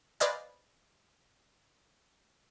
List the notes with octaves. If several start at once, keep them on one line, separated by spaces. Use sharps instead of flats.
B4 C5 D5 D#5 F5 G#5